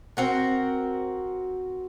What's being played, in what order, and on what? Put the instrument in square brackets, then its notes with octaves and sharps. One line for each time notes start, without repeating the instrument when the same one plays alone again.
[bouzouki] C4 F#4 A#4